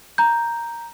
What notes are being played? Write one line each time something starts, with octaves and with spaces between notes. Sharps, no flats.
A#5 G6